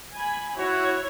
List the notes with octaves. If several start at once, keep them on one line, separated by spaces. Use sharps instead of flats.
G#5 B5
E4 F#4 C#5